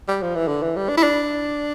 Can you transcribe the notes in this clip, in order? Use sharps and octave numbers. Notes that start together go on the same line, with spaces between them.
G3
F3
E3
D3
E3
G3
D4
E4
D4